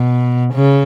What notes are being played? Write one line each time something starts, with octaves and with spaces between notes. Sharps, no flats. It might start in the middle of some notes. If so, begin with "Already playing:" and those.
Already playing: B2
C#3